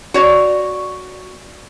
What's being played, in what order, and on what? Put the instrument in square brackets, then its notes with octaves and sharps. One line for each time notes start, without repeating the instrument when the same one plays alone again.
[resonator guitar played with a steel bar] F#4 C#5 D5